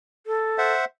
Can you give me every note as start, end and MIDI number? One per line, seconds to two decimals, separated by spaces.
0.27 0.73 69
0.58 0.85 72
0.58 0.85 76
0.58 0.85 78